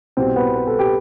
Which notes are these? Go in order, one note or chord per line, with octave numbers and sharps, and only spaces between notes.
C2 B2 G3 C4
B3
B4
A4
G4